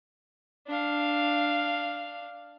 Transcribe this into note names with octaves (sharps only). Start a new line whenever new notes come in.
D4 F5